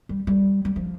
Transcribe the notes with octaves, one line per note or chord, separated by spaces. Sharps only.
G3
G3
G3
F3